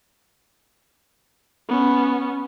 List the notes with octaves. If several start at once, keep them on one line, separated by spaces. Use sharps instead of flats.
B3 C#4